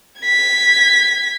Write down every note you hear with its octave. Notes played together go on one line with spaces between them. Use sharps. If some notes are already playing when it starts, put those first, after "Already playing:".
G#6 B6